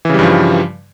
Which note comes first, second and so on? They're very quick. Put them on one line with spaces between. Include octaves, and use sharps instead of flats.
E3 C#3 G3 G2 F3